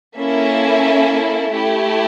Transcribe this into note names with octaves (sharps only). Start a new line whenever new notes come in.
A#3 C#4 E4 A4 E5
A3 E4 G4